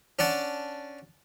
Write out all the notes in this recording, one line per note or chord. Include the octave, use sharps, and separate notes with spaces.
C#4 D4 F#5 A5